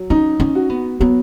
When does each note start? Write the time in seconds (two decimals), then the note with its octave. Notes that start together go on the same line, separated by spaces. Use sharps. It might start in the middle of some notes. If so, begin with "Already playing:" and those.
Already playing: F#3
0.10 C#4 D#4
0.40 C#4
0.55 F#4
0.70 B3
1.00 F#3 B3